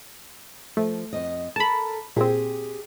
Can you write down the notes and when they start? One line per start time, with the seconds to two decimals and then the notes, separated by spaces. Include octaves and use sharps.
0.77 F3 A3
1.13 F2 D#5
1.56 A4 A#4 A5 B5
2.16 A#2 C4 G4 G#4